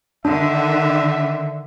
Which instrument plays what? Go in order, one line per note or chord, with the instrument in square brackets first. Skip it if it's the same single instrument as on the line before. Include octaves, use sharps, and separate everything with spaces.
[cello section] D3 D#3 [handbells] D4 [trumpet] E5